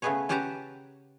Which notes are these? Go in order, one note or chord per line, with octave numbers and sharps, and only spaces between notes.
C#3 A3 B3 G#4 B4 C#5
C#4 G4 B4 F#5 A5 A#5